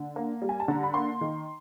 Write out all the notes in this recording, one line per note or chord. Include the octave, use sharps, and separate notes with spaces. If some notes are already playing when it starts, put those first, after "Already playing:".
Already playing: D3
A#3
G3
G#5
A5
D3 A#5
B5
A#3 C6
D#3